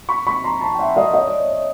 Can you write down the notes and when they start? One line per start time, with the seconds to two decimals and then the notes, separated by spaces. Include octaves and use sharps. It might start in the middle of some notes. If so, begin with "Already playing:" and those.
0.09 B5 C#6
0.27 B5 C#6
0.44 A#5 C6
0.61 A5 B5
0.75 G5
0.79 E5 F#5
0.96 D#5 F5
1.14 C#5 D#5
1.27 D5
1.40 C#5
1.53 C#5